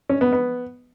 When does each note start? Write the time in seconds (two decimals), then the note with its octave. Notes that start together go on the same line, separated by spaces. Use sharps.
0.09 C#4
0.21 B3
0.33 B3